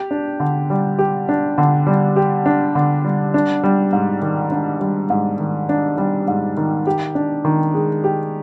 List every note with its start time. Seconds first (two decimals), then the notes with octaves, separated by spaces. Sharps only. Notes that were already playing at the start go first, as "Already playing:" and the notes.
Already playing: G4
0.11 D4
0.40 D3
0.70 G3
0.99 G4
1.29 D4
1.58 D3
1.87 G3
2.16 G4
2.46 D4
2.75 D3
3.05 G3
3.34 D4
3.64 G3
3.93 G#2
4.22 D#3
4.52 D4
4.81 G3
5.10 G#2
5.40 D#3
5.69 D4
5.98 G3
6.28 G#2
6.57 D#3
6.87 G4
7.15 D4
7.45 D#3
7.74 G#3
8.04 G4